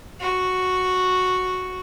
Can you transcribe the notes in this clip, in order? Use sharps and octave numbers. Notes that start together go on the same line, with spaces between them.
F#4